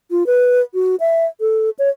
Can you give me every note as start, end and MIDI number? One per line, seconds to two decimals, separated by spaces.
0.11 0.26 65
0.26 0.61 71
0.74 0.96 66
1.00 1.25 76
1.41 1.70 69
1.79 1.89 73